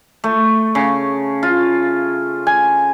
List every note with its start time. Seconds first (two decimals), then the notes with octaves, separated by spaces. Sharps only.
0.24 A3
0.75 C#3
1.43 F4
2.47 G#5